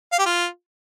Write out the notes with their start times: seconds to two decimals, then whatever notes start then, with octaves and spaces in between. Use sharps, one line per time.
0.12 F5
0.19 G4
0.26 F4